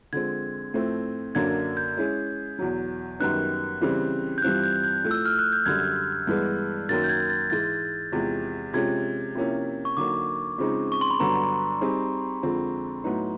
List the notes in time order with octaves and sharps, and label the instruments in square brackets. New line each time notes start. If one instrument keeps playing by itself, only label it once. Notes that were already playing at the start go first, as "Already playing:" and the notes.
[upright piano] D3 F3 G#3 C4 [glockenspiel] G#6
[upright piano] A2 F3 A3 C4
[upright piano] F#2 D3 F#3 A#3 D4 [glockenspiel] G#6
[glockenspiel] G6
[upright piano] G#3 C#4 E4 G#4
E2 B2 F#3
[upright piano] F#2 D#3 G3 B3 D#4 [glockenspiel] F#6
[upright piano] C#3 E3 G3 C4
[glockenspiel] G6
[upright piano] G2 E3 G3 C4 F4 [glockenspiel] F#6
[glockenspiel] G6
G6
[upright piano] A2 F3 A3
[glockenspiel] E6
F6
F#6
G6
[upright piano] F#2 D3 G3 [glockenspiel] G#6
[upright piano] G2 E3 G#3 B3
[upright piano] F#2 D#3 F#3 A#3 [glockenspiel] A6
[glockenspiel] G6
G#6
A6
[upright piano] G#2 E3 G#3 [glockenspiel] A6
[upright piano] E2 C3 F3 G#3
[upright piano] C3 F3 G#3 C#4 [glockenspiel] G#6
[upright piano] C3 F3 A#3 C#4 E4
[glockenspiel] C#6
[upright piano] D3 F#3 A#3 D#4 [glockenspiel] D6
[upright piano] C#3 F3 G#3 C4 D#4
[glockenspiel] C#6
C6
B5
[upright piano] G2 D3 F#3 B3 [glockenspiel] A#5
[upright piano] G3 C4 D#4 G#4
F2 D3 F3 G#3 C4
A2 F#3 B3 D#4